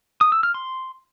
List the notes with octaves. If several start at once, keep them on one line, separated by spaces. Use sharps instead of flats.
D#6
E6
F6
C6